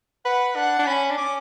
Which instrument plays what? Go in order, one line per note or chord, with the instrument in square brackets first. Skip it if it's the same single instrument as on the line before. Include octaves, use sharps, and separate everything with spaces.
[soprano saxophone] B4 [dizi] F#5
[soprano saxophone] D4 [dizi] F#5
[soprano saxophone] D4
[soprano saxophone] C#4 [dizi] B5
[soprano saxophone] D4
[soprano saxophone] C#4 [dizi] D6